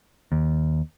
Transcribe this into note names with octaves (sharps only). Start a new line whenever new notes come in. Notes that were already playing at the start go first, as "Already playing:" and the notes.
D#2